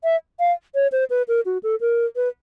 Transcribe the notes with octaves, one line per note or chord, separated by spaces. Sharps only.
E5
F5
C#5
C5
B4
A#4
F#4
A4
A#4
B4